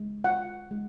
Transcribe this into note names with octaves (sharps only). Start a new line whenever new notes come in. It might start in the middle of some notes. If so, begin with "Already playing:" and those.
Already playing: G#3
F4 F#5
G#3